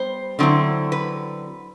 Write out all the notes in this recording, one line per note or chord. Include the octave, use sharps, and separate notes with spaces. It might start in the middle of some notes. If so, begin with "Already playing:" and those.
Already playing: G3 B3 C5
D3 F#3 C4 E4
B4